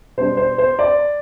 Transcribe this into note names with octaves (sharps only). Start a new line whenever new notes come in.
B2 G3 D4 C5
C5
C5
D5